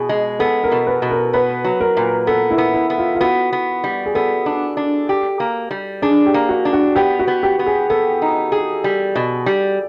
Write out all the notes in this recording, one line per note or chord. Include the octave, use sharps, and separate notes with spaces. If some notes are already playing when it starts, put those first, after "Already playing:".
Already playing: B2 G#4
G#3
B3 A4
A#4
B2
B4
B2
A#4
B3 B4
F#3
A#4
A#2
B3 A4
E4
B3
E4
B3
F4
F4
B3 F#4
B3
G3
G#4
B3 A4
D4
D4
G4
A#3
G3
D4 G#4
G4
A#3
F#4
D4
F#4
B3 G4
F#4
B3
G4
B3
G#4
B3 A4
D#4
G#4
G3
B2
G3